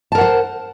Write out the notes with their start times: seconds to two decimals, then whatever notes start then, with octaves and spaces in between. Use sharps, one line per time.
0.12 A5
0.15 A#4
0.18 F#5
0.21 C5